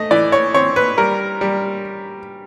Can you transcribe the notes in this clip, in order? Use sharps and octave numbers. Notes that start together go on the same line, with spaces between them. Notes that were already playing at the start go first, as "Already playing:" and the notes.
Already playing: A3 D#5
E3 D5
C#5
C4 C#5
B4
G3 A#4
G3